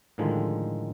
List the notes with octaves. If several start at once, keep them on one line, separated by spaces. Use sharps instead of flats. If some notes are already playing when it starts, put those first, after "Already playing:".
A2 D3 D#3 F3 G#3